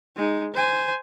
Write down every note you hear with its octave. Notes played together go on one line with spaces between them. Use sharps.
G#3 D#4
C5 G#5